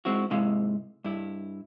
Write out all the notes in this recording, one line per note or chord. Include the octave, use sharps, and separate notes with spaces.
G#3 C4 E4 F#4
G#2 C3 G#3 E4 F5
G2 E4